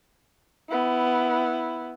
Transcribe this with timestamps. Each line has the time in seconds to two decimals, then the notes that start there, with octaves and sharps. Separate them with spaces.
0.69 B3 E4